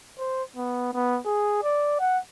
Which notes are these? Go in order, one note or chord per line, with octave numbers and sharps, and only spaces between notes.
C5
B3
B3
G#4
D5
F#5